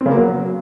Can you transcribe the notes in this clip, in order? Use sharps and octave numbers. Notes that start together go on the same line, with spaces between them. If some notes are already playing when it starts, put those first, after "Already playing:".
C4
C#3
A#3
F#3